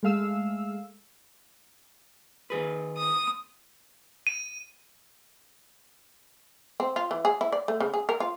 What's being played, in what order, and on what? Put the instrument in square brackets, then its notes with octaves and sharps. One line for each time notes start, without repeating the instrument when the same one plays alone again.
[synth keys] G#3 A3 F5 E6
[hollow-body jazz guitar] D#3 G#4 B4
[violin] D#6
[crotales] D#7
[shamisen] C4
F4
E3
G#4
E4
D5
A3
C#3
G#4
A#4
F4